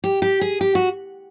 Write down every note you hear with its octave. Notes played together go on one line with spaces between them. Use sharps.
G4
G4
G#4
G4
F#4